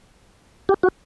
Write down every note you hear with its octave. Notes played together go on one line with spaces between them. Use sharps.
G4
F#4